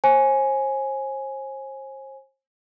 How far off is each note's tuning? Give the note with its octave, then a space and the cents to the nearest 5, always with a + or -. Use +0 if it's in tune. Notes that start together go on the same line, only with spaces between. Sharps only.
C5 +40 G#5 +5